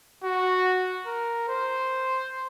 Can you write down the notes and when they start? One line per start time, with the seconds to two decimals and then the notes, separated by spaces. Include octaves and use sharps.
0.24 F#4
1.06 A#4
1.48 C5